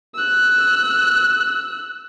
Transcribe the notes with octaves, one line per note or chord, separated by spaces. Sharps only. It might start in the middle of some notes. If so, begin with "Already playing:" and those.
E6 F#6